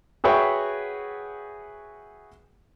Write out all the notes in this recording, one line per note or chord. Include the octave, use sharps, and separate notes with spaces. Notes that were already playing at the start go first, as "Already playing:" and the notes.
F#4 G#4 B4 C#5 E5 G5